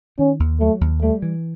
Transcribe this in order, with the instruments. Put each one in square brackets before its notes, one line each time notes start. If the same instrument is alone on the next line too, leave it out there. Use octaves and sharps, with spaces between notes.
[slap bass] D#3 [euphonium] C#4
[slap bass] D#2
[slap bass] F#3 [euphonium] A3
[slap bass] D#2
[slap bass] G3 [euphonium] A3
[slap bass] E3